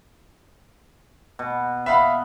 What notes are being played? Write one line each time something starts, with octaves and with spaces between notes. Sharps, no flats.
B2
B3 E5 F5 B5